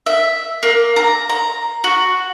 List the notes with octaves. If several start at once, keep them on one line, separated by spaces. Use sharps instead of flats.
E5
A#3
A#5
A#5
F#4